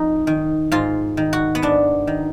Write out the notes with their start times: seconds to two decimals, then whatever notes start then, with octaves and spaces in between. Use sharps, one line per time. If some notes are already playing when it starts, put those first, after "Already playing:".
Already playing: F2 D#4
0.27 D#3
0.72 G#2 F4
1.17 D#3
1.33 F#4
1.55 B3
1.62 G#2 D4
2.07 D#3